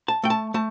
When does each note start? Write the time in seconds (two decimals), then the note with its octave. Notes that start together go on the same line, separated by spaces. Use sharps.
0.08 A5
0.24 A3 G5
0.30 A5
0.54 A3 A5